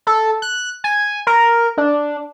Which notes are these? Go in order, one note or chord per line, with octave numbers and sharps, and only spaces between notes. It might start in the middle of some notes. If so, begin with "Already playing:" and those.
A4
F#6
G#5
A#4
D4